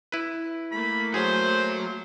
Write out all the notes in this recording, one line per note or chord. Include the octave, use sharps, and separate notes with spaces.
E4 B4
A3 A#3 B5
F#4 G#4 C5 C#5